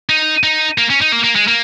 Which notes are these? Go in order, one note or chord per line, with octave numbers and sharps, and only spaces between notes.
D#4
D#4
A#3
C#4
D#4
A#3
A#3
G#3
A#3